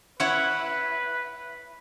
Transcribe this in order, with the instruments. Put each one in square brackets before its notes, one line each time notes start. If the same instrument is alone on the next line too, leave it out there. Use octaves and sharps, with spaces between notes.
[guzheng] E4 C#5 F#5 [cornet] B4